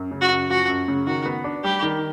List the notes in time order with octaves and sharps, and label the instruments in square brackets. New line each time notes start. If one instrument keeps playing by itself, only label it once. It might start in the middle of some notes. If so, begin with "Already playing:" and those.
Already playing: [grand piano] F#2
C#3
[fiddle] F#4
[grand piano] F#2
[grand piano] F3 [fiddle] F#4
[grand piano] F#2
C#3
[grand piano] D#3 [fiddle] F#4
[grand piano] B3
D4
[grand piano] G3 [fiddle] G4
[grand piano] D#3